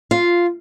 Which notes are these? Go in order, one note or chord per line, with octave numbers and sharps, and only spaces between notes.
F4